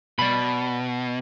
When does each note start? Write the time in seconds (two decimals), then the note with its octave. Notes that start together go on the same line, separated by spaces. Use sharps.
0.19 B2 D5 B5